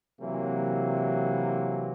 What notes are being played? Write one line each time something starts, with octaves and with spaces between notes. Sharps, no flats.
C3 E3 F#3 A#3